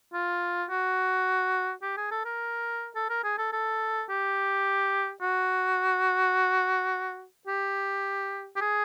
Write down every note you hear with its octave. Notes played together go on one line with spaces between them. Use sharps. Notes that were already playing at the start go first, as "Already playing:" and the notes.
F4
F#4
G4
G#4
A4
A#4
A4
A#4
G#4
A4
A4
G4
F#4
G4
G4
G#4